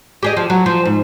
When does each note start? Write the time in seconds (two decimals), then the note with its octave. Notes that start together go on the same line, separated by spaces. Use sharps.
0.23 G4 G#4 D#5
0.37 F3
0.50 F#3
0.66 F3
0.85 G#2